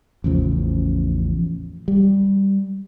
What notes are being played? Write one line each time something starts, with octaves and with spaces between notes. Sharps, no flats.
A1 E2 C#3 F3
G3